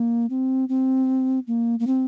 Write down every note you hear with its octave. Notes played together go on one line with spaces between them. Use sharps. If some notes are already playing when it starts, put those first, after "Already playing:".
Already playing: A#3
C4
C4
A#3
A#3
C4